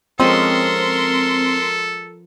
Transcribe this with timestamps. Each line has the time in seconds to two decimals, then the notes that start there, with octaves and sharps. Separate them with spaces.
0.20 F3 G#3 C4 C#4 A4 A#4 C6